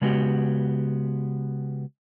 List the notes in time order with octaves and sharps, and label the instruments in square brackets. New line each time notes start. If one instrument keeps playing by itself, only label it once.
[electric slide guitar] C#3 G#3 B3 F#4 G4